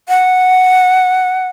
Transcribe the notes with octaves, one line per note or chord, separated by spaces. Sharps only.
F#5